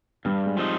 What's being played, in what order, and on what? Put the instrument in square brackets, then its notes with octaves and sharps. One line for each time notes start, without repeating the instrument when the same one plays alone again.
[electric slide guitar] G2 [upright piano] G3
[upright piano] G#3
[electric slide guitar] F3 C4 D#4